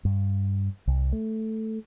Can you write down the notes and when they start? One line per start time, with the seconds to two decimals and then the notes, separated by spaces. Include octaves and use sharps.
0.05 G2
0.87 C2
1.13 A3